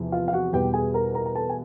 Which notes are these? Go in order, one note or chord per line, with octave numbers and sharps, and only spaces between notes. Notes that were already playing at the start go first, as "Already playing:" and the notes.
Already playing: E2 C3 F3
F4 F5
F5
F#4 F#5
E2 B2 G3 G4 G5
G#4 G#5
A#4 A#5
A#4 A#5
A#5
A4 A5
G#5